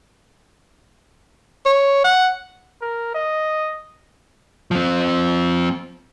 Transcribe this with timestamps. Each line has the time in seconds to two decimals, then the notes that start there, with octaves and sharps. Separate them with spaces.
1.66 C#5
2.04 F#5
2.82 A#4
3.15 D#5
4.71 F3 C4